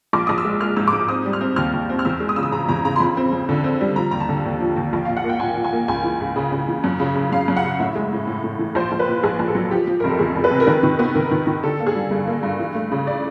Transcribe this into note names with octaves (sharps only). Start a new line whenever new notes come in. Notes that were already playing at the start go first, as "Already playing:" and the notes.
A#1 D6
A#1 D#6
E6
G#3
G#3 F6
G#2 E6
D6
G#2 D#6
C4 D#6
G3
F6
C4
D#2 F6
D#2
C4
F6
E2 E6
G#3
D#6
C#3 E6
D#6
C#3 A#5
E2 A#5
C#3 A#5
C6
F2 B5
C4
F2
D3
C4
G3
F3 A#5
D#2 A#5
A5
D3
D#2
F3
D#2
A#1
A#2 F5
F#5
A#3 G5
A#2 G#5
A#2
G#5
A#3
C#2 G#5
E3
C#2
C#3
C#3
E3
F#2
C#3
C#3
F#2 F5
F#2
F#5
C#3
A2 E5
G#3
A2
A2
A2
E3
A#1 C5
A#1
B4
A#2
A#1 G#4
A#1
A4
F#3
F3 G4
F3
F1 A#4
A4
E2 G#4
F1
B4
C3
A#4
D#3 B4
D#3
B3
D#3 A#4
D#3
D#3
D3 A4
A#3
G#4
G3
G2
A#3
G2
E3
A3
C#3
D5